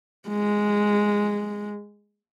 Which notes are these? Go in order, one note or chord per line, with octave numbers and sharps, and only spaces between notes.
G#3